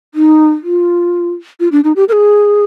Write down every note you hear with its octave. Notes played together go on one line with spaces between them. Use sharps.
D#4
F4
F4
D4
D#4
G4
A#4
G#4